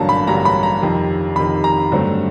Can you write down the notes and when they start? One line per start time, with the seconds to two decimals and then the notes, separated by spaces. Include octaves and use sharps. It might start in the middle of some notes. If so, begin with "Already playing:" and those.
Already playing: A1 G2 D3 F#3 A#3 A5 A#5
0.09 B5
0.27 A1 G2 D3 F#3 A#3 A#5
0.45 B5
0.63 A#5
0.82 F2 C3 D#3
1.36 F2 C3 D#3 B5
1.64 A#5
1.92 G2 D3 F#3 A3 C4